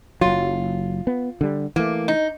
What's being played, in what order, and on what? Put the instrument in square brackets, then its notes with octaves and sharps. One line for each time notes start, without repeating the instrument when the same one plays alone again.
[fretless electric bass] F#1 F#3 [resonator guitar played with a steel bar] F4
[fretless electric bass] B3
D3 G3
[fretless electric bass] E3 A3 [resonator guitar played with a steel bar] A#3
[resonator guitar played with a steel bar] D#4